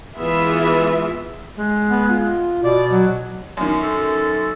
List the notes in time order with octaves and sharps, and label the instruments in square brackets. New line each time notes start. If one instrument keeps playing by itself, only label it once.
[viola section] E3 G#3 B3 F4 G#4 E5
[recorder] G#3
[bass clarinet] B3
F4
[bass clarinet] B2 [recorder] D5
[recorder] F#3
[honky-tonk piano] F#2 D#3
[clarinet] A4